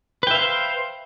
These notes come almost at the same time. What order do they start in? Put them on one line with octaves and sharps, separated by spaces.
B4 G5 E5 F5 C5